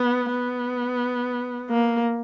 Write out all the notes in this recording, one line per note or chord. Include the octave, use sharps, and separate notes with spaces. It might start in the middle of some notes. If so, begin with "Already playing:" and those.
Already playing: B3
B3
A#3